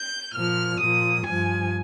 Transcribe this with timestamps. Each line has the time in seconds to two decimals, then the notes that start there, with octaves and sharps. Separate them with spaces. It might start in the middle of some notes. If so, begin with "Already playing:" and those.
Already playing: G6
0.34 A#2 F3 F6
0.80 A#2 F3 D#6
1.27 G2 F3 G#5